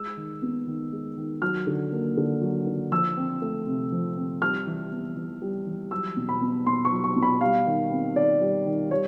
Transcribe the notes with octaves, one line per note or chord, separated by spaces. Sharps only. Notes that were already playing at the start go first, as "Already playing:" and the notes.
Already playing: G#3 E6
D#3
B3
D#3
G#3
D#3
F#3 F6
D3
A#3
D3
F#3
D3
F3 E6
C4
A3
C3
F3
C4
G3 F6
E3
B3
E3
G3
E3
F#3 E6
B2
B5
B3
B2 C6
C#6
F#3
C#6
B2
B5
G3 F5
D#3
C4
D#3 D5
G3
D#3
G3 C#5